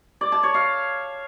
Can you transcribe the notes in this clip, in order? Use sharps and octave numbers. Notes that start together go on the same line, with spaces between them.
D5
A5
C#5
F5